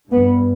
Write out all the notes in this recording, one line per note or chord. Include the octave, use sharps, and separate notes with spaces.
G2 B3